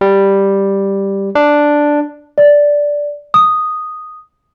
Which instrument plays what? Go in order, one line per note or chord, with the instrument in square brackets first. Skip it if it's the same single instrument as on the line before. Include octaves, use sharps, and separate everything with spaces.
[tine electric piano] G3
D4
[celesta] D5
D#6